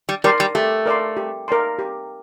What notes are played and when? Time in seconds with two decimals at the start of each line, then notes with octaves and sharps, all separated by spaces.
0.09 G3
0.24 G3 A#4 D5 A5 C6
0.40 G3
0.55 A3 G4
0.86 A#4 D5 A5 C6
1.17 G4
1.48 A#4 D5 A5 C6
1.79 G4